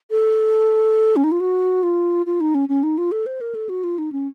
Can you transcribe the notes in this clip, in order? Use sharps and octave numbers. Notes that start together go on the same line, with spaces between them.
A4
C#4
D#4
F4
F#4
F4
F4
D#4
C#4
C#4
D#4
F4
A4
C5
A#4
A4
F#4
F4
D#4
C#4